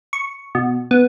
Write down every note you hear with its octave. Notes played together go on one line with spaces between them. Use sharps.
C#6
B2
B3